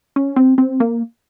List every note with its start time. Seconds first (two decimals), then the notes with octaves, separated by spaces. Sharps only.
0.16 C#4
0.36 C4
0.58 C4
0.80 A#3